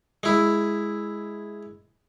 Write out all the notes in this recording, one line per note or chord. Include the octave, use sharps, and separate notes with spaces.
G#3 E4